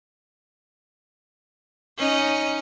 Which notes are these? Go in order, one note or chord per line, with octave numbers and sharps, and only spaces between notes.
C#4 D#4 D#5